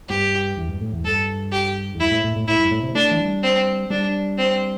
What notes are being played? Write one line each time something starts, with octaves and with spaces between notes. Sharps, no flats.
G2 G4
E2
G2
A2
E2
G2 A4
G4
E2
G2 E4
A2
A2
A2
A2 E4
G2
A2
C3
A3 D4
E3
G3
C4
G3 D4
C4